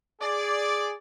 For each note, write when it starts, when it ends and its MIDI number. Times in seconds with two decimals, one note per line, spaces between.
0.21 0.91 68
0.21 0.91 74